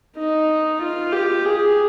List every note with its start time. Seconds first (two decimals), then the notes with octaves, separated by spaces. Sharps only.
0.17 D#4
0.81 F4
1.12 G4
1.44 G#4